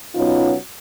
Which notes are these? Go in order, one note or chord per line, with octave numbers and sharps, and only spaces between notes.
B2 F#3 B3 C#4 D#4 F4